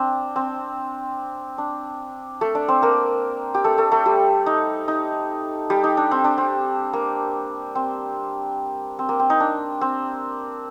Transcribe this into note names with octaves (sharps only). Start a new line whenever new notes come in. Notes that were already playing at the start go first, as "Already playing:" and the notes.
Already playing: C4 D4
C4
D4
A3 A4
D4 D5
C4 C5
A#3 A#4
G4
A3 A4
A3 A4
A3 A4
G3 G4
D#4
D#4
G3 G4
D#4
D4
C4
D4
C4
A#3
C4
C4
A#3
C4
D#4
D4
C4